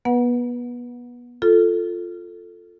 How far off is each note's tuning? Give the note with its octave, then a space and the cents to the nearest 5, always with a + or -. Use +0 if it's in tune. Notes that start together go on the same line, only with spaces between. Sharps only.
B3 -25 B4 -15 F#5 -15
F4 +0 A4 +0